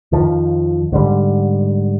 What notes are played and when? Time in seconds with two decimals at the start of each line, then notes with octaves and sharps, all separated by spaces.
0.12 F2 D#3 F3
0.92 G#2 D3 G3